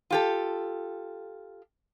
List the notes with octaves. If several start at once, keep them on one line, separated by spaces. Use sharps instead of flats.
F4 G4 A4